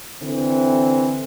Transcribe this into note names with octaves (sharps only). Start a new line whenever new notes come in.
D3 E3 C4